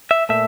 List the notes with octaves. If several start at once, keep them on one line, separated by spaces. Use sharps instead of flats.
E5
A#2 A3 E5